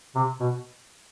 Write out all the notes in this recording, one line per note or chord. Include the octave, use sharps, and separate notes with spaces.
C3
B2